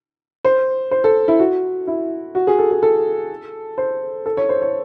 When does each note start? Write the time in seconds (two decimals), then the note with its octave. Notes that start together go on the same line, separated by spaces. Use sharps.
0.45 C5
0.91 C5
1.04 A4
1.28 E4
1.39 F#4
1.87 E4
2.35 F#4
2.47 G#4
2.58 A4
2.71 G#4
2.83 A4
3.78 C5
4.26 A4
4.37 C#5
4.49 C5
4.62 C#5